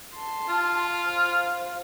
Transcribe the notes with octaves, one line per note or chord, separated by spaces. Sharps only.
A5 C6
F4
C5 F5